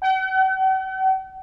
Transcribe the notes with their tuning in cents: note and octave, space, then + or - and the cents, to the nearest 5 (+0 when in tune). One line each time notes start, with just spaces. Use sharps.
F#5 +45